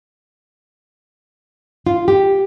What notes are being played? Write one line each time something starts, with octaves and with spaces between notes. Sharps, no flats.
F4
G4